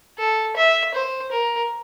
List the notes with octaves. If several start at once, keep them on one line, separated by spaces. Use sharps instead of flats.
A4
E5
C5
A#4